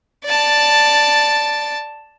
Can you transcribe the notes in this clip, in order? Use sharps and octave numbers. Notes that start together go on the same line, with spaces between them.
D5 A5